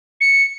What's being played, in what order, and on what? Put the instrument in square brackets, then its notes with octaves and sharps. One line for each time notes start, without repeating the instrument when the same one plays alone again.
[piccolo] C#7